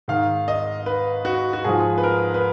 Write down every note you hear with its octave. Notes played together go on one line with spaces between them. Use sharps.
G#2 D#3 F5
D#5
B4
F#4
F#4
G#2 F3 G#4
B4
A#4
B4